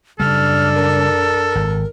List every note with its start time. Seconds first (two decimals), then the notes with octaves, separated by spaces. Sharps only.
0.20 F#2 C#3 G3 D4 A4 F6
0.75 A#4
1.55 G#1